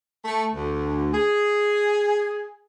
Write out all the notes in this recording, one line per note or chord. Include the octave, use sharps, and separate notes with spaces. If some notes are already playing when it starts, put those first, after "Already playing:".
A3
D2
G#4